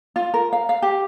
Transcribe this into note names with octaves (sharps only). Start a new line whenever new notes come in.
F4
A#4
F5
F5
G4